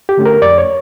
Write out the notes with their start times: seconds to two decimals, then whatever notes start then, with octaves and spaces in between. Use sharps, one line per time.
0.09 G4
0.17 D3 A3 C#4
0.26 A#4
0.42 F2 D5
0.58 C#5